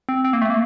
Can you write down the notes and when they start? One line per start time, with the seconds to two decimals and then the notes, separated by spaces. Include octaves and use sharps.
0.09 C4
0.24 C4
0.33 A#3
0.42 A3
0.50 A#3